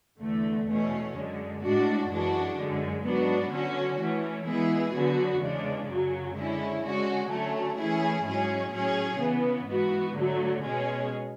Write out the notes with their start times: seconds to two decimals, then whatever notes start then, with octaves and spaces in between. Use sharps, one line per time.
0.20 E2 D3 A3
0.67 E2 B2 A3 C#4
1.14 F#2 D3 G#3
1.62 A2 G#3 D4 F#4
2.09 F#2 E3 G#3 D4 F#4
2.56 F#2 D3 G#3
3.04 G#2 F#3 B3 D4 F#4
3.51 D3 F#3 C#4 F#4
3.98 E3 A3 C#4
4.45 E3 G#3 B3 E4 G#4
4.93 D3 F#3 B3 F#4
5.40 E2 C#3 G#3 D4
5.88 F#2 C#3 F#3
6.34 D3 G#3 C#4 E4
6.82 D3 G#3 C#4 F#4
7.29 D3 F#3 A3 C#4
7.77 E3 A3 C#4 E4 G#4
8.24 G#2 F#3 C#4 G#4
8.71 A2 F#3 C#4 G#4
9.19 C#3 E3 B3
9.66 G#2 E3 B3 F#4
10.13 D3 F#3 A3
10.61 B2 G#3 C#4 G#4